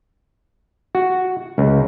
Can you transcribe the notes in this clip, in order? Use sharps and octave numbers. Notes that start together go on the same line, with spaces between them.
F#4
C#2